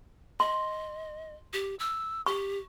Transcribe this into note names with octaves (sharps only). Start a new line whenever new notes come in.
D#5 C6
G4
E6
G4 C#6